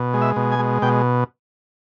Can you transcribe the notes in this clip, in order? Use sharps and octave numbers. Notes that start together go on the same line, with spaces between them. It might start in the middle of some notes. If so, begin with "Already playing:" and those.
Already playing: B2
G#3
E5
B2
G#5
G#3
B2 G5